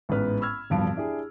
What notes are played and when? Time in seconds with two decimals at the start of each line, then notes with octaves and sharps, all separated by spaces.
0.09 A1 G#2 B3 B4 F6
0.40 B5 C#6 E6 F6 G#6
0.70 D1 E2 G2 F3 F5 D7
0.96 D4 E4 G4 G#4